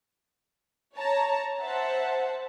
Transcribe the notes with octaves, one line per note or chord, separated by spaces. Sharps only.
C#5 A5 A#5
C5 E5 F#5 A5